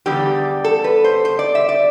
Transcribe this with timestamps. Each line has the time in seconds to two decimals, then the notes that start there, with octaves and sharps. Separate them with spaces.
0.06 E2 D3 G3 G4
0.64 A4
0.84 B4
1.04 C5
1.25 C5
1.39 D5
1.55 E5
1.69 D5